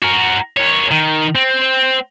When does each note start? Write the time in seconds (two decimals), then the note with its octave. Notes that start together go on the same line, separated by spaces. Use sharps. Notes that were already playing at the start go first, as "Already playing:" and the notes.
0.02 F#4 A#4
0.57 A#3 C#5
0.91 D#3
1.35 C4